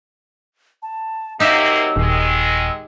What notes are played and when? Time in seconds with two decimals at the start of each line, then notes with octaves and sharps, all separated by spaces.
0.83 A5
1.40 C3 F#3 A#3 D#4 G4 E5 E6
1.96 D#1 D#3 G#3